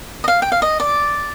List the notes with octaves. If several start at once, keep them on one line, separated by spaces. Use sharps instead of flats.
D#5
F5
G5
F5
D#5
D5